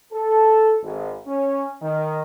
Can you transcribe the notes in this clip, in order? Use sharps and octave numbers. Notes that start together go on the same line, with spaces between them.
A4
G#1
C#4
D#3